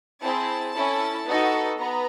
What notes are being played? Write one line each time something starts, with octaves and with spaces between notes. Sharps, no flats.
C4 E4 G#4 A5
C#4 E4 A4
B3 D#4 F#4 A4
B3 A#5